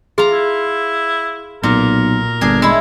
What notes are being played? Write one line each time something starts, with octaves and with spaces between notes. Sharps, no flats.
F4 G#4 A#5
E4
B1 A#2 A#4
G1 D4 G#4
G#3 E4 E5